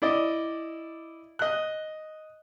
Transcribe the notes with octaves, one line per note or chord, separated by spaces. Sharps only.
E4 D5 D#5
D#5 F#6